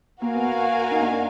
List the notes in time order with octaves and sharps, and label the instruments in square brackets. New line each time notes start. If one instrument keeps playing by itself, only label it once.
[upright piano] A#3 [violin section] F#4 A#4 F5 G#5
[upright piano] B3
A#3
D#4
A#3 D4
D4